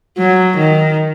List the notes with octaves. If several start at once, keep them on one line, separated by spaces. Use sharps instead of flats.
F#3
D#3